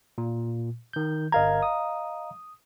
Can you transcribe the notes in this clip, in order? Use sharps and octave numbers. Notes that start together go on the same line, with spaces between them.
A#2
D#3 G6
G1 A#4 D#5 F5 A#5 G#6
D#6